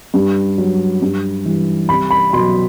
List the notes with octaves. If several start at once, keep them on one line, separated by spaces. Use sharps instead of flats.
G2
F#3
G2
E3 G3
C2 B5
B5
B2 F#3 C6